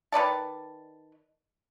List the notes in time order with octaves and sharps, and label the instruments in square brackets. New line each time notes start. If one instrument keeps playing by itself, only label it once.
[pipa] D#3 B4 D5 A5